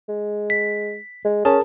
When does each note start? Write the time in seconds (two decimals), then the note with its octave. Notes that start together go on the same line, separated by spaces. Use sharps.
0.08 G#3
0.50 B6
1.25 G#3
1.45 C#4 G#4 A#4 A5